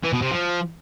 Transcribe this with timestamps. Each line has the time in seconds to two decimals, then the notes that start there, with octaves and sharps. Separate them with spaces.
0.04 E3
0.13 B2
0.22 C3
0.31 F3